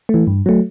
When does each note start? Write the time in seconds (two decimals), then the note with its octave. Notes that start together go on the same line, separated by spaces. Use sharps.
0.09 E3 A3
0.27 G2
0.46 F#3 A3